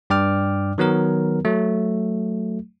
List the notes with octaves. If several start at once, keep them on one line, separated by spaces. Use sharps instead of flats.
G2 D5 G5 D6 F6
D#3 F#3 B3 A#4
F#3 A3